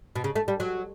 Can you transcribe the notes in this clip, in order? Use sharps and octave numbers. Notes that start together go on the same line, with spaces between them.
B2
C#3
A3
G3
F#3